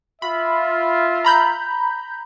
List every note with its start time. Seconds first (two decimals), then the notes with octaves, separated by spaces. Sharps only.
0.22 F4 E5 B5
1.25 A#5 B5 G6